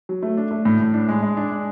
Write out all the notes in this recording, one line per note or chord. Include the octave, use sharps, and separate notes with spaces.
F#3
A3
D4
A3
A2
A2
D4
G#3
G#3
D4
G#3